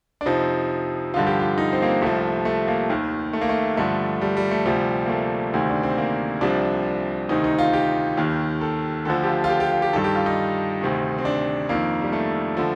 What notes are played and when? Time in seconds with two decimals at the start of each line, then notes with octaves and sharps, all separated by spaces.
0.21 D4
0.26 F2 C3 F3 D#4
1.14 G2 D3 F3 F4
1.27 G4
1.40 F4
1.58 D#4
1.73 C4
1.82 A#3
1.87 C4
2.02 C2 C3 F3 A3
2.45 A3
2.68 A#3
2.90 D#2 D#3
3.33 A3
3.41 A#3
3.49 A3
3.77 G2 D3 F3 A3
4.21 G3
4.37 G3
4.51 A3
4.65 D2 C3 F3 G3
5.06 A#3
5.09 A3
5.54 D2 C3 D#3
5.70 D4
5.83 C4
5.98 A#3
6.41 C2 C3 F3 D4
7.29 D2 C3 D#3 D#4
7.44 D#4
7.58 F4
7.73 G4
8.17 D#2 D#3
8.61 A4
9.05 D2 D3 F3 A4
9.23 G4
9.27 F4
9.44 F4
9.49 G4
9.60 G4
9.71 F4
9.82 G4
9.93 G2 D#3 A4
10.04 G4
10.15 F4
10.26 D#4
10.81 D2 C3 D#3
11.18 C4
11.25 D4
11.69 F2 D#3 A#3
12.02 G3
12.13 A3
12.57 D3 F3